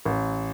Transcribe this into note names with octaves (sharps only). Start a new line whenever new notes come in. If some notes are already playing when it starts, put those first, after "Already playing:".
A1